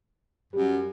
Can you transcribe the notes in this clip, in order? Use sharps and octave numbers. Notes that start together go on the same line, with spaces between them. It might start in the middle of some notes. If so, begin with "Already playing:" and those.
F#2 G3